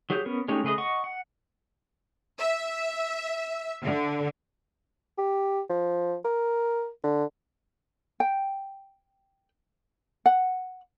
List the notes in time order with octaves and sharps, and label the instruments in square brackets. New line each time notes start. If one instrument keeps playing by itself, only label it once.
[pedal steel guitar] F#3 G4 G#4 C#5 G6
B3 C#4 A#4
G#3 A3 C#4 D#4 G4
C#3 A3 G#4 B4 D#5
D#5 F#5 C#6
F#5
[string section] E5
D3
[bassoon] G4
F3
A#4
D3
[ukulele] G5
F#5